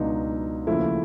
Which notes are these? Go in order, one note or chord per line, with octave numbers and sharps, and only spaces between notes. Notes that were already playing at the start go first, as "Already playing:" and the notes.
Already playing: C#2 B2 F#3 D4 D#4
D#2 C#3 F3 A3 E4